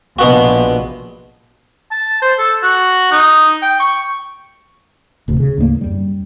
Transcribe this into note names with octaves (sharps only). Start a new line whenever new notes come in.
A#1 B2 B3 F#4
A5
C5
A4
F#4
D#4
G5
C#6
D1 D2 C3
C#3
D2 G#2 G3 A#3
F#2 G3